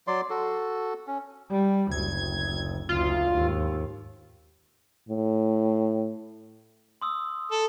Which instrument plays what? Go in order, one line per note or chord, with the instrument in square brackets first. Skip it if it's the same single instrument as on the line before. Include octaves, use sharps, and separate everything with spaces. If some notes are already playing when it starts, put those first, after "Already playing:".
[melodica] F#3 D5 C6
F#4 A4
C#4
[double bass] G3
[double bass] F#1 D2 [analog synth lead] G#6
[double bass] F#1 D2 [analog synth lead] F4
[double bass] D#2 G#2
[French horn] A2
[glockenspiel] C6 D#6 E6
[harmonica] A4